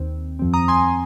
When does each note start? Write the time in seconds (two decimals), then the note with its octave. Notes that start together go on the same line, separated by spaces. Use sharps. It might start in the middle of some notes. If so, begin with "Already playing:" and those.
Already playing: D#2 D#3 C4
0.39 F2 F3 C4
0.54 A#5 D#6
0.68 G#5 C6